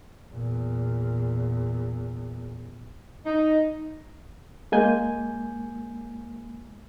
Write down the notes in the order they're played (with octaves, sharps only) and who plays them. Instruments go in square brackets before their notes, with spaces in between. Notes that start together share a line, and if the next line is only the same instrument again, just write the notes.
[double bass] E2 A#2
[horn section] D#4
[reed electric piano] G#3 A#3 G#5 G6